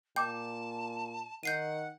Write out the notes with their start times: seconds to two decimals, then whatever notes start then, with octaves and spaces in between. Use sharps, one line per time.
0.16 A#2 G5 A5 D6 G6
1.43 D#3 F#5 G6 C7 D#7